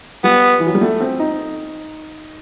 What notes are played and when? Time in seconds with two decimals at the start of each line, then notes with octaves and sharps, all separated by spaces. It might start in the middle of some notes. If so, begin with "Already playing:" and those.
0.24 G3 B3
0.60 E3
0.67 F#3
0.75 G3
0.81 A3
1.00 C4
1.20 D#4